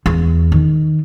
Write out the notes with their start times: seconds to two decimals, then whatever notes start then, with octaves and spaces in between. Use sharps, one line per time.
0.06 E2
0.52 D#3